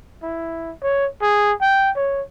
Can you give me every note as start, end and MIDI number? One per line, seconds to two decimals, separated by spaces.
0.23 0.71 64
0.83 1.06 73
1.22 1.52 68
1.61 1.91 79
1.96 2.22 73